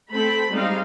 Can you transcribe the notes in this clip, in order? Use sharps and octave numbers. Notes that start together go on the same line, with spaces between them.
A3 C4 A4 B5
G3 G#3 C4 D#4 F5